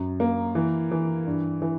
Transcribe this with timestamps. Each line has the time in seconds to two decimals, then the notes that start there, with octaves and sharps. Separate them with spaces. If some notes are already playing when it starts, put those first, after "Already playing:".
Already playing: F#2
0.20 A#3
0.55 E3
0.91 E3
1.26 G2
1.62 E3